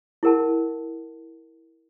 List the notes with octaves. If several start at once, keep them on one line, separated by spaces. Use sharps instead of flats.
E4 G#4 A#4 F#5 A5